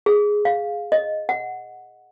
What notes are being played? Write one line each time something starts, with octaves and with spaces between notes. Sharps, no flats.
G#4
F5
D#5
F#5